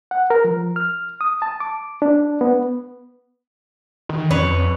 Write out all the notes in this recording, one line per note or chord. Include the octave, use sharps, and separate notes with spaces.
F#5
A#4
F3
F6
D#6
A5
D6
D4
B3
D#3
F2 B4 C#5